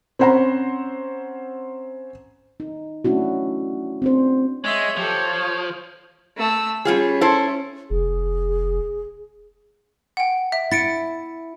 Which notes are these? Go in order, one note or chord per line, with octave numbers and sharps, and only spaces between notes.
C4 C#4 C5 F#5 A#5 B5
D#4
A3 C#4 D4 E4 F#4
C4 D4 C5
G#3 C#5 E5 C6
F3 G4 A4
F4
A3 E6
G3 C#4 F4 G#4
E4 A4 C5
F1 G#4
F#5 G5
E5
E4 A6 C#7 D7